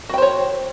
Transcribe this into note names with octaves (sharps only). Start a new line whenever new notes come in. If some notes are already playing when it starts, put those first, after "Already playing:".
F#4 C5 C#5 G5